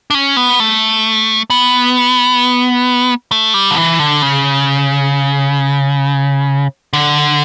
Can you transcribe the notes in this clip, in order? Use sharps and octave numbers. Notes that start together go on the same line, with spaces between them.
D4
C#4
B3
A3
B3
A3
G3
D3
E3
D3
C#3
D3